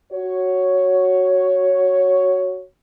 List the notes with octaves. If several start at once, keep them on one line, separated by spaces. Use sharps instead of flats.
F#4 C#5